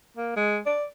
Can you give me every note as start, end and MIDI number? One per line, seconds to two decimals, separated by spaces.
0.17 0.36 58
0.36 0.59 56
0.66 0.85 74